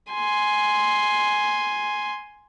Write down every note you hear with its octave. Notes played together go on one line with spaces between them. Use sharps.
G#5 C6